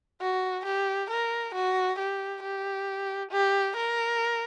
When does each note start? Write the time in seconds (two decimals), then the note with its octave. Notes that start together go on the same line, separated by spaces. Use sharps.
0.21 F#4
0.66 G4
1.10 A#4
1.55 F#4
1.99 G4
2.43 G4
3.31 G4
3.76 A#4